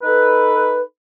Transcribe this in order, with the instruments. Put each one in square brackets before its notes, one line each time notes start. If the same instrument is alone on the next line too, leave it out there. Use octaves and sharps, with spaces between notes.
[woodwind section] D#4 A4 B4